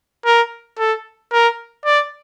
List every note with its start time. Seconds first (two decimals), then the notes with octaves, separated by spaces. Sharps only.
0.25 A#4
0.78 A4
1.32 A#4
1.85 D5